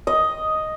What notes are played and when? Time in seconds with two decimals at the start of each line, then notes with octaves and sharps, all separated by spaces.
0.07 D#5